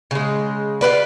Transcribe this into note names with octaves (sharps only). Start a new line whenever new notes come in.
C#3 G#3
F4 G4 B4 D5